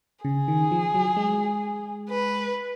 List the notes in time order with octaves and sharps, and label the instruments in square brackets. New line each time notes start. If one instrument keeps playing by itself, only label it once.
[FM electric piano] C#3 [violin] G#4
[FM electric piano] D#3
F3
F#3
G#3
[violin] B4